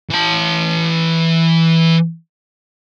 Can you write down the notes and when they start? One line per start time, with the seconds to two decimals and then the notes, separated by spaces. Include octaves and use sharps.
0.10 E3 A5